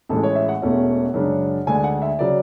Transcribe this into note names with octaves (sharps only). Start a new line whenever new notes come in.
A1 A2 E3 G#3 A4
C#5
E5
F#5
E1 E2 B2 A3 C#4
F#2 C#3 G#3 D4
D2 D3 G#3 G#5
F#5
E5
C#3 F#3 D5